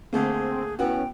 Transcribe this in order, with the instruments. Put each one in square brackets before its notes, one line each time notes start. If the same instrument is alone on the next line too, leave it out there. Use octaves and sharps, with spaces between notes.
[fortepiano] D3 A3 A#3 [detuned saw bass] C4 [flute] G#4
[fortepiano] A2 B3 F#4 [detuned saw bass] C#4 [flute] G5